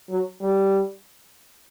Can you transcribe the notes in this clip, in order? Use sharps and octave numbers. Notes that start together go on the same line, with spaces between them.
F#3
G3